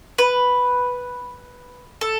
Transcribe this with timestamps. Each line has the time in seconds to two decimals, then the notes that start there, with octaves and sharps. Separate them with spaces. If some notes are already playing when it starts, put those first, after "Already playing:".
0.18 B4
2.01 A4